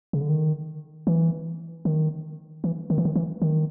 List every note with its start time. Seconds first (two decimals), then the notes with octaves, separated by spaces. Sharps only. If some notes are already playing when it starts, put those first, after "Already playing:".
0.13 C#3
0.21 D3
0.29 D#3
1.07 E3
1.85 D#3
2.64 E3
2.90 D#3
2.98 E3
3.05 D#3
3.16 E3
3.42 D#3